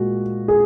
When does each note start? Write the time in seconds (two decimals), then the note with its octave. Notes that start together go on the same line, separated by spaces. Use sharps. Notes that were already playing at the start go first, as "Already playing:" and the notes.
Already playing: A#2 G#3 F#4
0.48 G#4